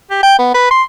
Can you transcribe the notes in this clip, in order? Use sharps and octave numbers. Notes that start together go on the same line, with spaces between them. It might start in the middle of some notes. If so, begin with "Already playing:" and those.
G4
G5
B3
B4
C6